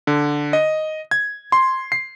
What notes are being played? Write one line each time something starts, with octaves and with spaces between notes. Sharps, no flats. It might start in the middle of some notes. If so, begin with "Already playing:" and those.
D3
D#5
G#6
C6
C7